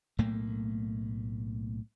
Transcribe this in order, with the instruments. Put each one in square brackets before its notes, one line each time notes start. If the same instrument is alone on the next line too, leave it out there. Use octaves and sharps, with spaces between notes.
[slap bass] B1 A2 A3 A#3